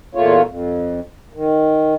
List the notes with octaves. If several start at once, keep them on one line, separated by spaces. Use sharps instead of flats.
E2 A#2 A3 A#3 F4 C#5
F2
D#3